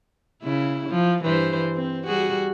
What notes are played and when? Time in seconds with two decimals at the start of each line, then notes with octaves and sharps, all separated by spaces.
0.42 C#3 E4
0.90 F3
1.23 G2 E3 C5
1.75 C4
2.06 G3 F#4 G#4